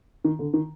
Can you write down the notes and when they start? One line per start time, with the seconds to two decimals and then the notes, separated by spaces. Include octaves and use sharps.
0.24 D#3
0.39 D3
0.54 D#3